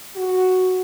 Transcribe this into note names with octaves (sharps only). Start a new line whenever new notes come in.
F#4